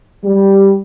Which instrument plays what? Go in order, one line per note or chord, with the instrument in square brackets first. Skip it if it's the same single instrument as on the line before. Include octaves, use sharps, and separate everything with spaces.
[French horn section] G3